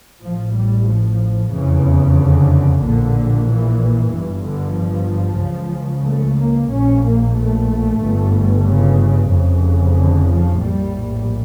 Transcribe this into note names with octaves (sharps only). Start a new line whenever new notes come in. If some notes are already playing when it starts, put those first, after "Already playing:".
A1 A2 F3
G3
F3
F1 E2 C#3 E3
D3
A#1 A#2 D3
E3
G1 G2
D3
F3
C#2 C#3
A3
A#3
A#1 A#2 C#4
A#3
A3
G1 G2
C#3
F1 F2 C#3
D3
F3
A#1 A2 G3